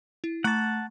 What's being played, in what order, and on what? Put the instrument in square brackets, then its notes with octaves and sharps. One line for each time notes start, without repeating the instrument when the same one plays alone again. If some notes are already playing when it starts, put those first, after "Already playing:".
[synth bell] E4
[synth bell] A3 A#5 C#6 [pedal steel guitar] F#5 A5